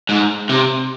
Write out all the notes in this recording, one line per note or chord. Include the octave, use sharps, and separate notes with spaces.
G#2
C3